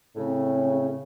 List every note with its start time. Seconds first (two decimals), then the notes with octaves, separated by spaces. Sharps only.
0.16 A2 C#3 C4